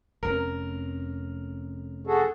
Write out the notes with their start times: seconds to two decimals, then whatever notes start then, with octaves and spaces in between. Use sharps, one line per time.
0.23 F1 F2 C#4 A#4
2.07 F#4 G#4 A4